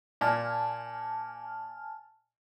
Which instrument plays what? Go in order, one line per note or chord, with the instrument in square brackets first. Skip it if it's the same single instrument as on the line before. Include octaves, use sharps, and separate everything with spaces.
[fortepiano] A#2 [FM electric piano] G#5 A5 F6